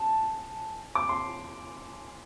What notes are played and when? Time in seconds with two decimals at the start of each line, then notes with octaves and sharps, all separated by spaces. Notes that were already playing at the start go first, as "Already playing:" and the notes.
Already playing: A5
0.95 D6
1.09 C6